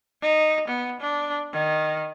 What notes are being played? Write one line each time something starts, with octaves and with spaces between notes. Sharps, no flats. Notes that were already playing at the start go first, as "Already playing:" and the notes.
D#4
B3
D4
D#3